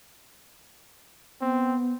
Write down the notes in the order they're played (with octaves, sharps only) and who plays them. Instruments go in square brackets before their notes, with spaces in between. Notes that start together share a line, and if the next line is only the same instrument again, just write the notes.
[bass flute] B3 [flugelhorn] C4